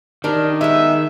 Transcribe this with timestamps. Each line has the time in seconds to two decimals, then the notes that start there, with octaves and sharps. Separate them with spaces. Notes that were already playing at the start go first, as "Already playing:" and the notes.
0.24 D#3 D4 G4 A#4
0.61 G#3 B3 E5